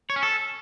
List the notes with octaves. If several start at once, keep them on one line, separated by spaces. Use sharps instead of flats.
C#5
C#4
A4